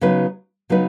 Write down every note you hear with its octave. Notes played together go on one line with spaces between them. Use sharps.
C#3 F#3 B3 D#4 B4
C#3 F#3 B3 D#4 B4